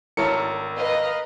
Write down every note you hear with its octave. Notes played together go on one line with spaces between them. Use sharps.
G#1 E4 A4 A#4 C#5 C#7
B4 D#5 F5